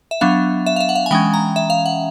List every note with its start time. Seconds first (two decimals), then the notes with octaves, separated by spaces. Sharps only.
0.11 E5
0.21 F#3 B3 D4 F5
0.66 E5
0.76 F5
0.80 E5
0.89 F#5
0.95 F5
1.06 G#5
1.11 E3 G#3 C#4 G5
1.34 A#5
1.56 E5
1.70 F5
1.86 F#5